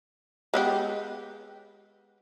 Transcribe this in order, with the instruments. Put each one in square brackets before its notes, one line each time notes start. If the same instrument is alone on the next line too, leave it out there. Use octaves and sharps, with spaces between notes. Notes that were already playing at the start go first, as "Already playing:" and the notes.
[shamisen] G#3 B3 G4